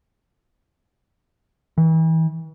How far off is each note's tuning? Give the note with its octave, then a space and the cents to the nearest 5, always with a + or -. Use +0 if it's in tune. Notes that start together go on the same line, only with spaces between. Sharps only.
E3 -35